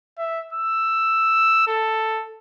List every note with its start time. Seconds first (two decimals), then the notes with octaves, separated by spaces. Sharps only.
0.18 E5
0.53 E6
1.67 A4